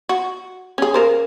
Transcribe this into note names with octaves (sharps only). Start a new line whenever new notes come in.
F#4
C#4 G#4
C#3 A#4 C5